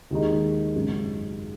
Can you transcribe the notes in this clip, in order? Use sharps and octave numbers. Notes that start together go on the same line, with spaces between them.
D#2 D#3 G#3 D#4
G#1 F#2 C#3 F#3